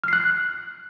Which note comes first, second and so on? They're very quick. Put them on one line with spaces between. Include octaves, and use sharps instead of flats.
F6 C7 F#6